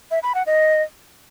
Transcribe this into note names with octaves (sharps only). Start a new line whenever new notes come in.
E5
B5
F#5
D#5